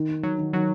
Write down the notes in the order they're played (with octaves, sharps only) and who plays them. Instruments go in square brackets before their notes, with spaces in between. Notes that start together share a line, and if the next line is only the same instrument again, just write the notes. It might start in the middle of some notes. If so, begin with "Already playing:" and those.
Already playing: [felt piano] D#3
D#4
[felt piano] D#3 [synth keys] F#3
[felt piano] D#3
[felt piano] D#3 [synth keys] F#3